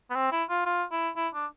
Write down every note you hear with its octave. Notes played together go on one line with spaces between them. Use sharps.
B3
C4
E4
F4
F4
E4
E4
D4